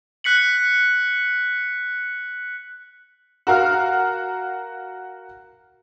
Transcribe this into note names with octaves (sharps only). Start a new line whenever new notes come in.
F#6 B6 C#7 F#7
F#4 A#4 F5 F6